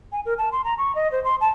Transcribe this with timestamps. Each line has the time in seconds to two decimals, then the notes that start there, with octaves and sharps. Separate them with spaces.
0.12 G#5
0.26 A#4
0.38 A5
0.52 C6
0.64 A#5
0.78 C#6
0.95 D#5
1.12 C5
1.24 C6
1.41 A5